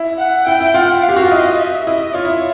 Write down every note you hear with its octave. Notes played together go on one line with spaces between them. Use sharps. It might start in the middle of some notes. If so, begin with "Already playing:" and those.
Already playing: E4
F#5
E4 G5
E4
F4 F#5
F5
G4
F#4
F4
E4 D#5
E5
E4 D#5
F4 C#5
E4